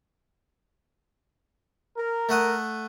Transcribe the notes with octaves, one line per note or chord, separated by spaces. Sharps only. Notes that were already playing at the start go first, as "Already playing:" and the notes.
A#4
A3 F#5 D#6